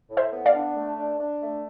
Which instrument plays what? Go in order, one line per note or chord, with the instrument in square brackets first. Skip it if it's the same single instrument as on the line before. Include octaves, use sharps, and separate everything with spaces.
[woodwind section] A2
[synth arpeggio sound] C5 E5
[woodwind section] B3
[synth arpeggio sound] D5 F5
[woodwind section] D4
A3
D4
D4
A3